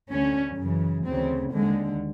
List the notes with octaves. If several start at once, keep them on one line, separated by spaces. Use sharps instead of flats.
D2 D3 C#4
F#2 C#3 E3
D2 C#3 E3 C4
D#2 D3 G#3